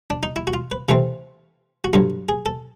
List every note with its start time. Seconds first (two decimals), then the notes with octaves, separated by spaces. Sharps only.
0.10 D4
0.23 D#4
0.36 E4
0.47 F#4
0.54 F4
0.72 B4
0.89 C3 E3 A3 C4 F4
1.84 F#4
1.93 G2 D3 F#3 F4
2.29 G#4
2.46 A4